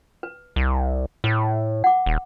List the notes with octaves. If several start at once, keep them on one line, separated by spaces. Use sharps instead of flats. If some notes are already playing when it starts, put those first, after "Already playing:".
B4
C2
A2 B4
F#5 D6
D#1